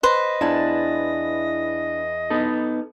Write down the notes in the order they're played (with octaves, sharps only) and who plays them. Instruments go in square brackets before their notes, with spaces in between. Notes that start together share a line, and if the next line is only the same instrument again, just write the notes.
[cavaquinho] B4 C5 [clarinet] D#5
[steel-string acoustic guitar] E2 E4 A5 [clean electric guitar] D4
[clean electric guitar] B3 D#4 A4